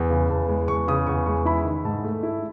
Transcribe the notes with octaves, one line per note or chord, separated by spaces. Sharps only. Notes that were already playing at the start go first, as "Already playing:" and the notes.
Already playing: E2
C#3
E2 A5
G#3
E2 C#6
C#3 D#6
E2 C#6
G#3 C#6
E4 B5
D#3
G#2 A5
A3
E4